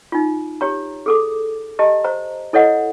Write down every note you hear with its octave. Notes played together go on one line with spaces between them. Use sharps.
D#4 F4
G4 C#5 A#5
G#4 A4 D6
G4 D#5 A5 A#5
C5 A#5
E4 A4 C#5 D#5 F#5